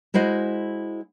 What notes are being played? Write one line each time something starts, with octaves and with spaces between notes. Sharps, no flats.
G#3 E4 F#4 C5 D#5